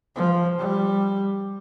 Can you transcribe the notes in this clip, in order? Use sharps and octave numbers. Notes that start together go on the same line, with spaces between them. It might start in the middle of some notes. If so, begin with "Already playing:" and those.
F3
G3